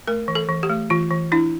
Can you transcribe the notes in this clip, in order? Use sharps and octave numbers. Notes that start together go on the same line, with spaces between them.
A3 A#4
E3
A4
E3
G4
A3
E3 F4
E3
D4 E4